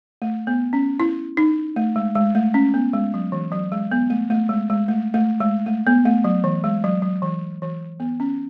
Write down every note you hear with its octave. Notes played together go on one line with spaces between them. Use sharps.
A3
B3
C#4
E4
D#4
A3
G#3
G#3
A3
C#4
B3
G#3
F#3
E3
F#3
G#3
B3
A3
A3
G#3
G#3
A3
A3
G#3
A3
B3
A3
F#3
E3
G#3
F#3
F#3
E3
E3
B3
C#4